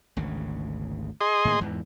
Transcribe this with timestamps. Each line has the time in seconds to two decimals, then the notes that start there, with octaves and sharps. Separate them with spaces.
0.17 G#1 D2 C#3
1.21 G#4 D#5 C6
1.45 A2 D#3 A#3
1.60 E2 G#2 E3